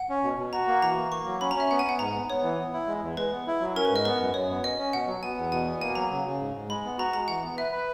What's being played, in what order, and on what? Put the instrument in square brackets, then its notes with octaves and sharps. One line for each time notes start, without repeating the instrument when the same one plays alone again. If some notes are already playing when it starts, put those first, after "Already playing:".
Already playing: [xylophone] F#5
[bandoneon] C#4
B2
B2
[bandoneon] F#4 [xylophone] A#5
[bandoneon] A#3
[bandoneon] E3 [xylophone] A#5
[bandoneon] A#3
[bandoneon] A#3 [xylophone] C#6
[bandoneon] F#3
[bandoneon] C#4 [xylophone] B5
[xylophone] A#5
[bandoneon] C#4 [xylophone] E5
[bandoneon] B3 [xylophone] F#5
[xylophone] G#5
[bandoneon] B3 [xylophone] F#5
[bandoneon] G#2 [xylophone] A#5
[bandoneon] B3
[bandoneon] B3 [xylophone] C#5
[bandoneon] E3
B3
E4
G#3
E2
[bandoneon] G#3 [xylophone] B4
[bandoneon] B3
E4
F#3
[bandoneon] C#4 [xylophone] A#4
[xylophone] B4
[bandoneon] G#2
[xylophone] D#5
[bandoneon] B3 [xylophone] B4
[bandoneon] F#2
[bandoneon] F#2 [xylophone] C#5
[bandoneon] B3
[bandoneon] C#4 [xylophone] D#5
[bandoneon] C#4
[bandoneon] B2 [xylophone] F#5
[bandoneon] F#3
[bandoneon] B3 [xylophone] G#5
[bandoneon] E2
[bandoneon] B2 [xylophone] G#5
[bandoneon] B3
[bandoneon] A#3 [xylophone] G#5
[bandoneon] F#3 [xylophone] A#5
[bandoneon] C#3
C#3
G#2
G#2
[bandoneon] G#3 [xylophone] B5
[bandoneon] B3
[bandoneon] F#4 [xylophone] A#5
[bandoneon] G#3 [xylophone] A#5
[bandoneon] E3 [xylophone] F#5
[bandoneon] B3
[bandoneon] B4 [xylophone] E5
[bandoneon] B4